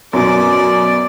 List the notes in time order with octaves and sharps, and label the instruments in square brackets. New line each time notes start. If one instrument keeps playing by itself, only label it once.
[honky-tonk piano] F#2 B2 [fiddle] D5